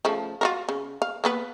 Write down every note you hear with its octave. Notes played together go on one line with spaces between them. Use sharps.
C#3 F3 A3
F4 F#4 A#4
C#3
F5
A#3 B3 B4